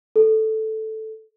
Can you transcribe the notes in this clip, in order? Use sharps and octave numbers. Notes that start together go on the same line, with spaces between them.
A4